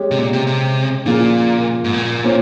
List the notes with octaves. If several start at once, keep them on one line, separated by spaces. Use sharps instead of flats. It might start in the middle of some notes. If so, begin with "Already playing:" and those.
Already playing: G#3 C#4 G4 C#5
C3
A#2
C3
C3
A#2 C#3 F3 A#3 F4 G#4
G#2
A#2
A#3 C#4 F4 C5